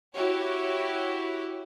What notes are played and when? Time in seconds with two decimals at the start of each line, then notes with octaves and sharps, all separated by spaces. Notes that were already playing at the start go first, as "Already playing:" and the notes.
0.14 E4 F#4 G4 C#5